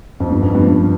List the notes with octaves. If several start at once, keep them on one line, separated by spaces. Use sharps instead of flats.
F2
G2
F2
G2
G2